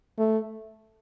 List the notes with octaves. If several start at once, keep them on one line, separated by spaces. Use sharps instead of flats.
A3